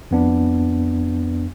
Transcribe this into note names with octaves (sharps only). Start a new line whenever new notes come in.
F2 B3 D4